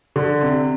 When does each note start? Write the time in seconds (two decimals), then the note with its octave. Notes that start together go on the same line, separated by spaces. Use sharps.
0.16 D3
0.43 C3